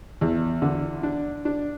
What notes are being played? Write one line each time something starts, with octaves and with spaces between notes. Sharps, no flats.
E2
D3
D4
D4